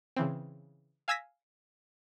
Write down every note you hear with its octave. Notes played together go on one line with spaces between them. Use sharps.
C#3 E3 C4
F5 G#5 E6 G#6 A#6 B6